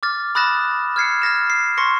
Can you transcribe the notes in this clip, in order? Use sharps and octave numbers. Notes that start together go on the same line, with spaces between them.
D6 F6 A6
B5 D#6 F#6 A6 A#6 E7
F6 G#6 C7 C#7
F6 A6 A#6 E7
C7
C6 C#6 A#6 C#7